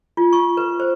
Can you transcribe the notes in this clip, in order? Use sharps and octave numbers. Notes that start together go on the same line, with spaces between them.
F4
C#6
B4
C5